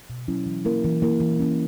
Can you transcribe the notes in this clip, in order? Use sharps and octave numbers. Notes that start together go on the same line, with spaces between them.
B2
F#3 C#4 E4
E3
A#3 E4 A#4
E3
A#3 E4 A#4
E3
A#3 C#4